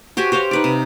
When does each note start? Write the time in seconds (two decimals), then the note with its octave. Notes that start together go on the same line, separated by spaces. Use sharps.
0.17 F#4 G4 C5 G#5
0.32 G4 C5 C#5 F5
0.51 D#4 B4 D5
0.64 C3